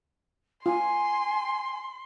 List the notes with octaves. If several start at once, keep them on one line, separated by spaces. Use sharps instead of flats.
F4 G#5 C6